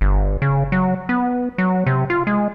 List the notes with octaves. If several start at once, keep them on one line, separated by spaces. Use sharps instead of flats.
G1
C#3
F#3
B3
F#3
C3
F4
G#3